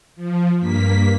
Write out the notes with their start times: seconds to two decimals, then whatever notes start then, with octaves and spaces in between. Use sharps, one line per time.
0.16 F3
0.59 G2 A#3 B6